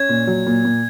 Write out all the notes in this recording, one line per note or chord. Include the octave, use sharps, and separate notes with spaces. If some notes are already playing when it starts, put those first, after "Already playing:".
Already playing: C#4 G#6
A#2
F#3
A#2
A#2